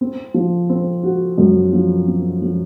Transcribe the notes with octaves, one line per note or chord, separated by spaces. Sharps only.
C4
F3
C4
F#4
F#2
F3
C4
F3